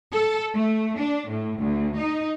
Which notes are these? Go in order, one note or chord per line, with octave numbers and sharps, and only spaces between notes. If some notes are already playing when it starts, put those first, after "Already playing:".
A4
A3
D4
A2
D2
D#4